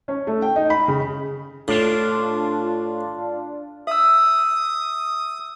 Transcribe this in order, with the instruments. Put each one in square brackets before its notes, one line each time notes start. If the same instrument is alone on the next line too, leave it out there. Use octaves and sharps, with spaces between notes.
[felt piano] C#4
A3
G5
D#4
B5
C#3
[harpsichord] A2 [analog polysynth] D4 F4
[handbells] E5 E6 [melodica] D#6